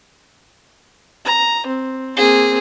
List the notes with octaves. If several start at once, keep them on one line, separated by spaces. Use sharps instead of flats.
A#5
C4
A#3 C4 G#4